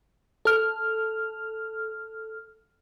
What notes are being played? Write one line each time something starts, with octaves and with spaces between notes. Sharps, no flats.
A4 F6